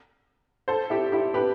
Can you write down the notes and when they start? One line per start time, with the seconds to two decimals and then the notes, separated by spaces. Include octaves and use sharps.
0.68 A4 C5
0.90 E4 G4
1.12 E4 G4
1.34 G4 B4